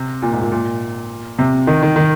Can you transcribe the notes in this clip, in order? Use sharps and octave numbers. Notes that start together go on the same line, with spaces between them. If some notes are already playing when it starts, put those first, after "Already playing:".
Already playing: C3
A#2
G#2
A#2
A#2
C3
D#3
D#3
D#3